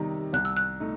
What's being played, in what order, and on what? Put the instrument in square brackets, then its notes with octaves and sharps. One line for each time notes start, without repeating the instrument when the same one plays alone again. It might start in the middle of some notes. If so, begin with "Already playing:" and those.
Already playing: [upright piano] C3 D#3 G3 D#4
[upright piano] C2 [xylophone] F#6
[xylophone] E6
F#6
[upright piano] A3 D#4